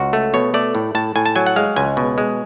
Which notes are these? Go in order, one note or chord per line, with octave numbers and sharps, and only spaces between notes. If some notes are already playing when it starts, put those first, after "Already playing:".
Already playing: C#2 F#4
A3
B2 C#5
A3 D5
A2
A2 A5
A2 G#5
A5
F#3 G#5
F#5
G#3 F5
C#2 G#5
B2
G#3